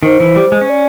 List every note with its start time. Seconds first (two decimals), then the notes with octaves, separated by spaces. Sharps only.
0.03 D#3 C5
0.20 E3
0.36 G3
0.52 G#3
0.61 C#4
0.69 D5